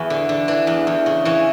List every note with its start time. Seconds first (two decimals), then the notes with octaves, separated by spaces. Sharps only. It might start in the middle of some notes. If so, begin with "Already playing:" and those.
Already playing: E2 B3 E4 F#4 G#4
0.10 D3
0.29 D3
0.48 E3 D4
0.67 E2
0.87 E2
1.06 C#3
1.25 E3 C#4